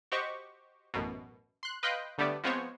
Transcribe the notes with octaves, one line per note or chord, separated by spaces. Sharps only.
F#4 G4 C5 D#5 C#6
A1 F#2 B2
C6 F#6
B4 D#5 F5 G5 C6 F#6
D3 G3 A3 B3 D5
F3 G#3 B3 C4 C5 C#5